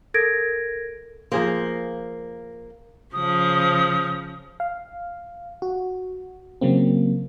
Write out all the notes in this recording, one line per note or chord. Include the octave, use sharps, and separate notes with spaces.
A4 A#4 G#6 A#6 D7
F3 A#3 G#4 C5
C#3 F3 D#6
F5
F#4
C#3 F#3 A#3 C4